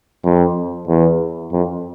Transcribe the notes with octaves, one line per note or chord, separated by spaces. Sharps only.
F2
E2
F2